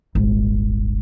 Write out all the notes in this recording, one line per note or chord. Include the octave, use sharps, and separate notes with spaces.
D#1 G#1